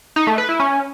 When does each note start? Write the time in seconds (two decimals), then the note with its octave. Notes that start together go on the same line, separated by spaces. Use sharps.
0.16 D#4
0.27 A3
0.38 B4
0.49 E4
0.60 C#4